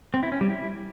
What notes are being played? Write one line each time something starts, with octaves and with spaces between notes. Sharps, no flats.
C4
E4
C#4
G3
E4